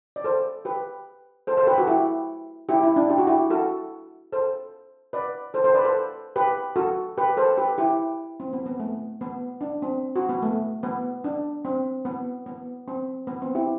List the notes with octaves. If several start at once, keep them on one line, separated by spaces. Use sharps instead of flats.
D5
A4 C5
G4 B4
A4 C5
A4 C5
G4 B4
F#4 A4
E4 G4
E4 G4
E4
D4
G4
F#4
E4 G4
F#4 A4
A4 C5
B4 D5
A4 C5
A4 C5
B4 D5
A4 C5
G4 B4
F#4 A4
G4 B4
A4 C5
G4 B4
E4 G4
C4
B3
B3
A3
B3
D4
C4
F#4
B3
A3
B3
D4
C4
B3
B3
C4
B3
C4
E4 G4